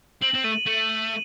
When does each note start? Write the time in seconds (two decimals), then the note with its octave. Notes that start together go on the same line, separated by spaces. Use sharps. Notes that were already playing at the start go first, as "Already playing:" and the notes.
0.22 C4 F#7
0.35 C4
0.44 A3 D#7
0.67 A3 D#7
0.89 F#7